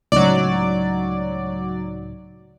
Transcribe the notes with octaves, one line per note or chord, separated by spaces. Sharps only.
C#2 A2 F#3 D#4 D5